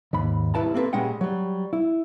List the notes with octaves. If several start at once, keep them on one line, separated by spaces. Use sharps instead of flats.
D#2 G#2 B5
C2 G2 E4 B4 A5 A#5
A#3 C4 D#4 A4 B4
A#2 G3 G#3 C#4 F#5 G5
F#3 G3
E4